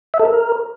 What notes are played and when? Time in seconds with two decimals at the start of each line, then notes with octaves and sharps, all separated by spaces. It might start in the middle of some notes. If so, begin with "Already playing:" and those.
0.14 E5
0.19 A4
0.25 A#4